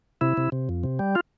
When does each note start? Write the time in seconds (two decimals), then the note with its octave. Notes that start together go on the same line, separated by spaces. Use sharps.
0.21 C3 E4
0.37 C3
0.52 C3
0.69 F2
0.84 C3
0.99 G3
1.15 F4